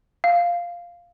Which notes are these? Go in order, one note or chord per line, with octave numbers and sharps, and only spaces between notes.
F5